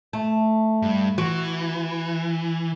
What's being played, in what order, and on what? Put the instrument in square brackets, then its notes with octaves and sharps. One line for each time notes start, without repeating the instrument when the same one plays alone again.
[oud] A3
[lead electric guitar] G2
[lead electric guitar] E3 [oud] F#4